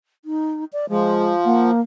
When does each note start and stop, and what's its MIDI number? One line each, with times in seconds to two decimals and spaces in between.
0.25 0.65 63
0.73 0.86 74
0.89 1.71 53
0.89 1.34 56
1.45 1.81 58
1.45 1.69 78